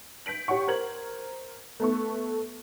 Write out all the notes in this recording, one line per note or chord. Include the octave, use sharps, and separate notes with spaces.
G6 B6 D7 F#7
G4 C#5 F#5 C#6
A#4 C5 G#6 F#7
A3 B3 A4 C#6